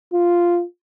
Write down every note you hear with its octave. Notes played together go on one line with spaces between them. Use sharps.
F4